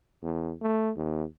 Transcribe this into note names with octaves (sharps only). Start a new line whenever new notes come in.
E2
A3
D#2